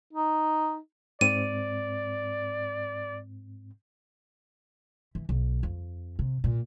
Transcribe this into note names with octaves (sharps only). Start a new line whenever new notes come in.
D#4
G#2 C4 D5 D#7
E3
B1
F2
C3
A#2